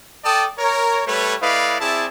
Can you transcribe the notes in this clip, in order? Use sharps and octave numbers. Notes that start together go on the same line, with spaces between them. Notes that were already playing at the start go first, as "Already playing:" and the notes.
A4 D5 G5 A5 D#6
A#4 C#5
G3 A3 B4 C#5
A3 E4 B4 D5 D#5 F5
C4 E4 G#4 D5 E5 A5